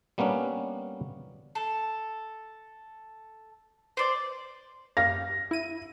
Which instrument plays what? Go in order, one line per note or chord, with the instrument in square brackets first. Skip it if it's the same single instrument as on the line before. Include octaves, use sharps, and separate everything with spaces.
[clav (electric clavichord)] G3 A#3 B3 C#4 D4
[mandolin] A4
C5 D5
[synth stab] F#2 G4 F5 [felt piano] A#6
[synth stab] E4 D#7